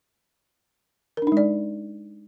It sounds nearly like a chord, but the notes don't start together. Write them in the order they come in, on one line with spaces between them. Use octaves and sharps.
A#4 D4 D#4 G#3 D5